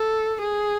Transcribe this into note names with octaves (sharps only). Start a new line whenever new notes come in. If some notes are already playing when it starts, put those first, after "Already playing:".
Already playing: A4
G#4